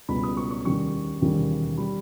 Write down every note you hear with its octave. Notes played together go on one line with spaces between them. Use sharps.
C#2 B2 G3 B5
D#6
C#6
C#6
D#2 C#3 G3 C#6
E1 D#2 C#3 G3
G3 B5